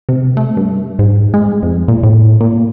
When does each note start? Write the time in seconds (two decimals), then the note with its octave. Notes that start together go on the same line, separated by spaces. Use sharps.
0.09 C3
0.37 A3
0.57 G2
0.99 G#2
1.34 G#3
1.62 F2
1.88 A#2
2.03 A2
2.40 A#2